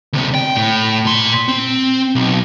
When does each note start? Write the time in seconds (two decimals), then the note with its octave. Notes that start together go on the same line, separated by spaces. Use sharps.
0.13 D2 C3
0.35 G5
0.57 A2
1.05 A#2 C6
1.48 C4
2.15 B1